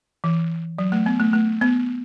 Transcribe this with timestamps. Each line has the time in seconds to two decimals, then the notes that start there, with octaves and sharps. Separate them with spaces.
0.24 E3
0.79 F#3
0.92 A3
1.06 B3
1.20 A3
1.33 A3
1.62 B3